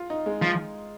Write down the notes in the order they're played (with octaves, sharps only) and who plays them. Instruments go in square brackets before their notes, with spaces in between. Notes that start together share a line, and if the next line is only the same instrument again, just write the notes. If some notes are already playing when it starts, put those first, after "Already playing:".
Already playing: [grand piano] F4
D#4
G#3
[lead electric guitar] F3